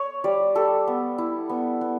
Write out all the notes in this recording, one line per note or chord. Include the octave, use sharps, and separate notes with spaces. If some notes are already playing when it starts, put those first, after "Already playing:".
Already playing: C#5
G3 D5
G3 A4
B3
E4
B3
B3